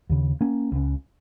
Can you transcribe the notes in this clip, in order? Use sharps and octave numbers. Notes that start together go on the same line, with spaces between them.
D#2 C#3
A#3 C#4
C#2 C#3